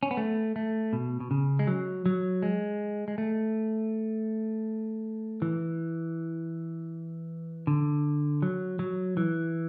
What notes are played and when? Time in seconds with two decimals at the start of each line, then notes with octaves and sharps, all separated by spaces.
0.03 C#4
0.11 B3
0.17 A3
0.56 A3
0.93 B2
1.20 B2
1.31 C#3
1.59 G#3
1.67 F#3
2.06 F#3
2.42 G#3
3.08 G#3
3.18 A3
5.42 E3
7.67 D3
8.42 F#3
8.79 F#3
9.17 E3